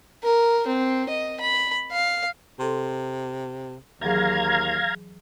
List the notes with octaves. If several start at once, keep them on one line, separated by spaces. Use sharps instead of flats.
A#4
C4
D#5
B5
F5
C3 A4 C6
D#2 E3 F#3 G#4 F5 A#5 G#6